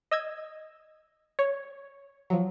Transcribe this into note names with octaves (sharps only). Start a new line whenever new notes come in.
D#5 E6 G#6
C#5
F3 F#3